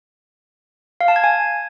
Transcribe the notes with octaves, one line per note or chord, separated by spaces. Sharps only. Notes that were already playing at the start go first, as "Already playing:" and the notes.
F5
A5
G#6
G#5